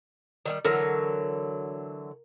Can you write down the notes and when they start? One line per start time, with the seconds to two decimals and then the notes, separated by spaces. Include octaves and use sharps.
0.46 D#3 F#3 G3
0.65 D3 E3 F#3 A#4 A#6